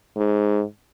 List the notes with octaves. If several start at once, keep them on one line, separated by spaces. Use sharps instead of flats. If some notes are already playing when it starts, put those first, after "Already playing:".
G#2